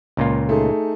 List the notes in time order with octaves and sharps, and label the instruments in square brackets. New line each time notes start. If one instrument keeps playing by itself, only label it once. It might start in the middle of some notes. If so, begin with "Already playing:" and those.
[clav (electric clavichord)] C#2 A#2 F4
[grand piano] A3 D#4 G#4